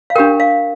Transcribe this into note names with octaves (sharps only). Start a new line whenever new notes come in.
F5
D4 G4 A#4 G5
F5